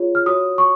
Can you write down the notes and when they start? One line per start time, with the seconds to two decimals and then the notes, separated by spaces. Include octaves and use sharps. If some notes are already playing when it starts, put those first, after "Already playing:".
Already playing: F4 G#4 C#5
0.15 F6
0.26 F#4 C#5 D#6
0.58 C#6